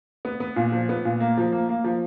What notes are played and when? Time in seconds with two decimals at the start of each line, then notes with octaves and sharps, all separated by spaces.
0.25 B3
0.40 B3
0.56 A#2
0.72 F3
0.89 B3
1.05 A#2
1.20 A#3
1.37 F3
1.52 A#3
1.69 A#3
1.84 F3